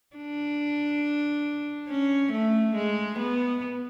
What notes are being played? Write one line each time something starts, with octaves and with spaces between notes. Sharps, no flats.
D4
C#4
A3
G#3
B3